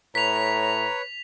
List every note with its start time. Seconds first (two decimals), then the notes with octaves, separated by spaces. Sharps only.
0.15 A2 B4 C#5 A#5 B6 F7